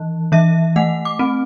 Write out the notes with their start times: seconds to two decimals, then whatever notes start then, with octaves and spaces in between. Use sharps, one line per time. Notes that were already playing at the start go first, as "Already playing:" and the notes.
Already playing: E3
0.32 E3 E5
0.76 A3 F#5
1.05 D6
1.19 C4